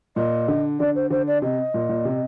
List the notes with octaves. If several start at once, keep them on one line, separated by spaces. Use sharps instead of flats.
A#2 D#5
D3
D3 D5
C5
D3 C5
D5
C3 D#5
A#2
A#2
C3